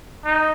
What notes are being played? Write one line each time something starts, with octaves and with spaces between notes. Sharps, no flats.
D#4